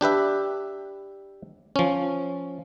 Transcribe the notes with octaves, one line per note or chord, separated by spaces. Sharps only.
D4 G4 B4 E5
F3 C#4